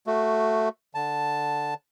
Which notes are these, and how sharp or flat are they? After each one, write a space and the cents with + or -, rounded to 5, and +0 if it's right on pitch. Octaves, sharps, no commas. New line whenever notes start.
A3 +5 F#4 +0
D3 +5 A5 +0